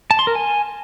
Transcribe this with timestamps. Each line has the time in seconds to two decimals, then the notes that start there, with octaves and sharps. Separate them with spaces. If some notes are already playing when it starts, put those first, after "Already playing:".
0.11 A5
0.19 C6
0.27 A#4
0.35 G#5